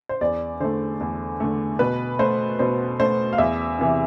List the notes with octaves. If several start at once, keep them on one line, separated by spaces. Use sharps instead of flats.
C5
E2 D5
D3 A3 C5
E2
D3 A3
B2 B4
A3 C5
B2 C5
A3 C5
F5
E2 E5
C3 E3